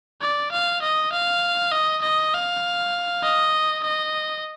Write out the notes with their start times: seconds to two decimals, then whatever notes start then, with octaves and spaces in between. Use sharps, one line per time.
0.21 D5
0.52 F5
0.82 D#5
1.13 F5
1.72 D#5
2.02 D#5
2.33 F5
3.23 D#5
3.84 D#5